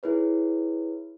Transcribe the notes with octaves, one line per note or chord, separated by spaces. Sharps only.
E4 G#4 B4 C#5